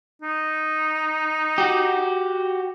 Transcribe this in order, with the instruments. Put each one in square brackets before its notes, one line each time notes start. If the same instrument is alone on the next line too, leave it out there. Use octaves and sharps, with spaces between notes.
[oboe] D#4
[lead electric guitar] F#4 G4